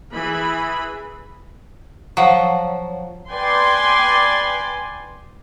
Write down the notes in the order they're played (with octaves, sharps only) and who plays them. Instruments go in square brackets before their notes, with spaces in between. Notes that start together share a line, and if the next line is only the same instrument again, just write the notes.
[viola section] E3 G#4 B5
[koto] F3 F#3
[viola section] B4 D5 G5 G#5 C6